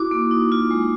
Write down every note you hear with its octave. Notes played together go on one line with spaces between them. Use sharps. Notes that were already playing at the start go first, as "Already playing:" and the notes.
Already playing: E4 F#4 D6
A#3
D#4
F4
G#3